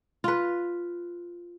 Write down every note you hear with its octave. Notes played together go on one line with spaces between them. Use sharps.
F4 B4